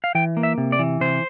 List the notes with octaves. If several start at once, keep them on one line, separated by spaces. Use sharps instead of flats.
F5
E3 G5
A#3
E5
C3
D5
E3
C3 C5